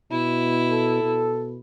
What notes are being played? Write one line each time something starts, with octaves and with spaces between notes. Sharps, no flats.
B2 E4
A4
B2